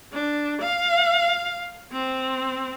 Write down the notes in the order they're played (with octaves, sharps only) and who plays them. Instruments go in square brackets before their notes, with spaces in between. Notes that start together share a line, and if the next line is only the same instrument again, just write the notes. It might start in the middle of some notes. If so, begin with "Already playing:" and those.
[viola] D4
F5
C4